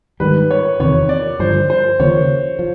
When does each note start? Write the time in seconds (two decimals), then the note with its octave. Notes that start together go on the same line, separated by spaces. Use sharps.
0.20 G#2 D#3 G3 B4
0.51 C#5
0.80 E2 C3 D#3 C#5
1.09 D5
1.39 G2 D3 F3 C5
1.70 C5
1.99 D#2 C#3 F3 A#3 C#5
2.59 F3